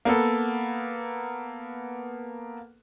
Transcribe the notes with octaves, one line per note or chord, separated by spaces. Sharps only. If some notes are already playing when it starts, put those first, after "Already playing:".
A#3 B3 A4